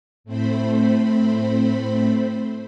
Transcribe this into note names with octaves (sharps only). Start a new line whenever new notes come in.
A2 A3 C4 C5 B5